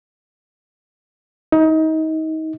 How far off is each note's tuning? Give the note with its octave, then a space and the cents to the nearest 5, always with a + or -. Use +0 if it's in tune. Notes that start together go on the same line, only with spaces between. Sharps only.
D#4 +30